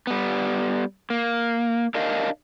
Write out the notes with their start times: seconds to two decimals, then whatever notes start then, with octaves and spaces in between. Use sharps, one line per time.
0.07 G3 B3
1.10 A#3
1.95 D4 A#4 D#5 F5